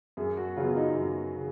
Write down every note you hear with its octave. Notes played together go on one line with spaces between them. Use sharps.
F#2 G#4
F#4
C#3 F#3 B3 F4
D#4
F#2
C#3